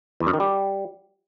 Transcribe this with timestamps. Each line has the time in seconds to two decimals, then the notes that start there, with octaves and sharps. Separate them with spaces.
0.20 E2
0.27 F#2
0.33 D#3
0.40 G3